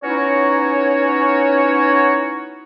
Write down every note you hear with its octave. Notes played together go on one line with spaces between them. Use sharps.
B3 C#4 D#4 E4 F#4 C#5